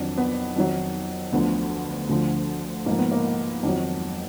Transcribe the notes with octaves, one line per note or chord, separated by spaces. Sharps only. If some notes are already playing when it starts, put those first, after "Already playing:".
Already playing: F2 D#3 F#3 D4
B3
F2 D#3 F#3
D2 D3 F3 B3
D2 D3 F3
G#2 F3 A#3
B3
A#3
F2 D#3 F#3